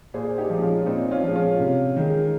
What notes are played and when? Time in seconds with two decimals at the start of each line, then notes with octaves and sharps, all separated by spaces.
0.14 A#2 G#4 C5
0.38 D#4 G4
0.50 F3 G#3
0.62 C#4 F4
0.86 A#2 C4 D#4
1.11 C#4 F4
1.23 F3 G#3
1.36 C#4 F4
1.59 C3
1.96 D#3 G#3